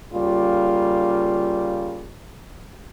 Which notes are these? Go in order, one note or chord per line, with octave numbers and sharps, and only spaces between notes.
C#3 G3 A#3 F4